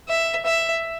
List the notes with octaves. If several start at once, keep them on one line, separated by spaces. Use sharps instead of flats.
E5
E5